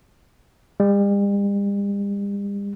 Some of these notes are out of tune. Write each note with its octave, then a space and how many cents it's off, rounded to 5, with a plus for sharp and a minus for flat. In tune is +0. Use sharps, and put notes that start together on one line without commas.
G3 +45